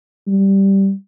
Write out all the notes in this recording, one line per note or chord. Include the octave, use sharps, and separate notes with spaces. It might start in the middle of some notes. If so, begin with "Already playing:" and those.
G3